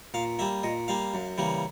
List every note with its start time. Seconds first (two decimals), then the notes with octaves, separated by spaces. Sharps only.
0.14 A#2 F5
0.39 G3 A#3 E5
0.63 A#2 D#5
0.88 G3 A#3 F5
1.14 F#2
1.38 C#3 E3 G3 A#3